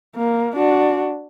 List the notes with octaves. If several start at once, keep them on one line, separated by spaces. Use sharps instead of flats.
A#3
D4 F#4